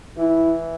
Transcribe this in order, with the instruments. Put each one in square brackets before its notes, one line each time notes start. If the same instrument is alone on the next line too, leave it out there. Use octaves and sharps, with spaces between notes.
[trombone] E3 [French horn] E4